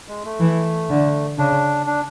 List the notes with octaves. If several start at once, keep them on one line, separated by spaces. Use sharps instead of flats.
G#3
A3
E3
D3
C#3 D4
D4